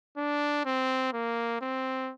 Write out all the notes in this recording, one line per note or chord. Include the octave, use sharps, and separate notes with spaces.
D4
C4
A#3
C4